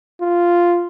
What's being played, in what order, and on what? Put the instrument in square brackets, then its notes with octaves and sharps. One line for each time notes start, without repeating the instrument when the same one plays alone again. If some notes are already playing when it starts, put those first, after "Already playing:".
[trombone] F4